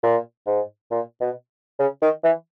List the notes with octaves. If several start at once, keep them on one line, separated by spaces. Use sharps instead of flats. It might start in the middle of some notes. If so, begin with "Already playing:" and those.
A#2
G#2
A#2
B2
C#3
D#3
E3